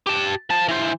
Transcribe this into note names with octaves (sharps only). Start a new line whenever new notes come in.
G4 A5
F3 A5
E3 C5